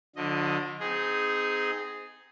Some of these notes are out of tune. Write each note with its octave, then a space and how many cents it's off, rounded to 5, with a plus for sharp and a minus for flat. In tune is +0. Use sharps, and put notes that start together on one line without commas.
D3 +0 F3 +45 D#5 +0
C4 -30 D#4 +0 G#4 +0